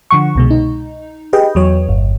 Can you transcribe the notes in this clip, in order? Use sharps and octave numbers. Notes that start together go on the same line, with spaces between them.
D3 F3 F#5 C#6
C2 B2 G#3
D#4
G4 G#4 B4 D#5 G5
E2 F#3 C#5
G1